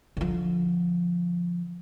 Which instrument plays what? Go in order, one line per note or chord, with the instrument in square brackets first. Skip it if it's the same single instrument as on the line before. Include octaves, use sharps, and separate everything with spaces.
[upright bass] D3 F3